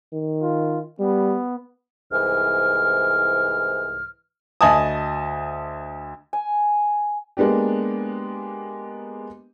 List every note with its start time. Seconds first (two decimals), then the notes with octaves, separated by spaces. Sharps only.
0.13 D#3
0.42 F4
1.00 G3 B3
2.12 C2 G#2 E3 F6
4.61 D2 D#5 G#5 A5 D#6
6.33 G#5
7.37 G#3 A#3 B3 D4 G4